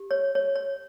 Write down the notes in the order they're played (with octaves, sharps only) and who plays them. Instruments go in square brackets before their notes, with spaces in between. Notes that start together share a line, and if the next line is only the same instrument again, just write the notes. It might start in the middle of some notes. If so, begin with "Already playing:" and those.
Already playing: [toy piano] G4
C#5
C#5
C#5